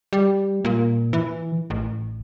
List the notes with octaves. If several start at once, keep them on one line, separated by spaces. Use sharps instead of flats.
G3
A#2
E3
A1